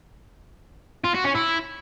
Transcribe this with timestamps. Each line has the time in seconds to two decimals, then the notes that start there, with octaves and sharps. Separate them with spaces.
1.04 F4
1.14 F#4
1.25 C#4
1.35 E4